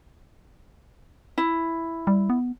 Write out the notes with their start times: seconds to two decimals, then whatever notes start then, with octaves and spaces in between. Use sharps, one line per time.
1.38 E4
2.07 G3
2.30 B3